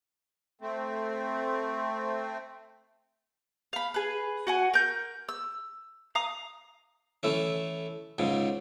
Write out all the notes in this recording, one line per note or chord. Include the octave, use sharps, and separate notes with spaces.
A3 C4
F5 B5
G#4 B4
F#4 F#5 G#5
A#4 G6
E6
F5 A#5 D#6
E3 A3 C#4
C#2 G#2 C#3